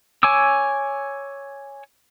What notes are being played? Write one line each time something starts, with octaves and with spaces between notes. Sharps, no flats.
C#5 G#5 C#6 D6 E6